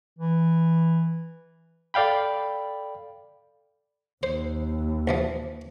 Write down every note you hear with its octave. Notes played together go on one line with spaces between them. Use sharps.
E3
A4 D5 F5 G5 B5
D#2 C5
A#1 E3 F3